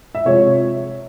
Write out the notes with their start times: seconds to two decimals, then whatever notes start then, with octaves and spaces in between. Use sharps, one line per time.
0.15 E5
0.25 C3 F3 G#3 C#5